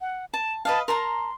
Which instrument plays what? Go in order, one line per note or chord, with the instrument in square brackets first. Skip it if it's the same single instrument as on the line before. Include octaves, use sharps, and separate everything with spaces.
[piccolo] F#5
[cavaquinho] A5 [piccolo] E7
[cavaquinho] B4 D#5 F5 [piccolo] A5
[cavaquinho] A#4 A5 A#5 [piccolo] C6